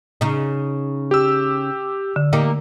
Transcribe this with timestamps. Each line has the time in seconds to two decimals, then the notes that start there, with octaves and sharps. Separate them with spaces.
0.21 C#3 D#4
1.11 G4 E6
2.16 D3
2.33 A#3 D#4 G4